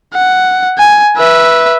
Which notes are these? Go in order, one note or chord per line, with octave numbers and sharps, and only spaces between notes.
F#5
G#5
B4 E5